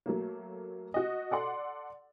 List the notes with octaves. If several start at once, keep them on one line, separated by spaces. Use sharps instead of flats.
F#3 A3 A#3
F#4 D#5
A4 D5 F#5 C6